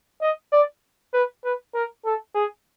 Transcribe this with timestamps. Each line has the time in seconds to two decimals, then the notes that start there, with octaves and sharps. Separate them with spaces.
0.22 D#5
0.53 D5
1.13 B4
1.44 B4
1.74 A#4
2.05 A4
2.35 G#4